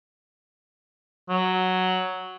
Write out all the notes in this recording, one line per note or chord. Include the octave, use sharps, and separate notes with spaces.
F#3